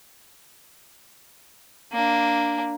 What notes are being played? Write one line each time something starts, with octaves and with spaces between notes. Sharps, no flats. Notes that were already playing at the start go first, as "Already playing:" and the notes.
A#3 D4